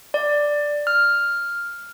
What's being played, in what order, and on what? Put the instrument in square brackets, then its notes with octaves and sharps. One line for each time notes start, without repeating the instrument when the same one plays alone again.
[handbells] D5
F6